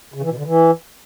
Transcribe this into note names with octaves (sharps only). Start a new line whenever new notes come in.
C#3
E3
B2
D3
E3